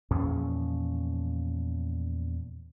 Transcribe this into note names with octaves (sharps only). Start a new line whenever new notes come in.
E2 A#2 F3 C#4